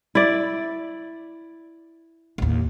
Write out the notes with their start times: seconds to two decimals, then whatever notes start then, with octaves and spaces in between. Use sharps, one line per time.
0.15 E4 D5
2.38 A1 D#2